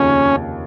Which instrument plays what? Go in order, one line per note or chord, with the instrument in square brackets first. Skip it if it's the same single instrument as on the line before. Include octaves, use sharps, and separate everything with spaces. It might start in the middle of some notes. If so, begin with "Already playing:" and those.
Already playing: [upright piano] F1 D#2 C#3 F3 A#3 [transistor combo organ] C#4